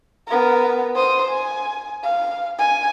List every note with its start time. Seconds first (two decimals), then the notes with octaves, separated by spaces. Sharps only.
0.27 B3 A#4
0.96 C5 D#6
1.29 G#5
2.03 F5
2.58 G#5